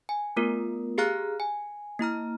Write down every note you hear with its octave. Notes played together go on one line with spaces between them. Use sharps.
G#5
A3 B3 F4 A#4
G4 G#4 F5 A#5 F6 F#6
G#5
A#3 E4 A#5 F6